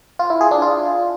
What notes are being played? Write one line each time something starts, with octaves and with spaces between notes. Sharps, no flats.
F4
E4
G#4
D4
F4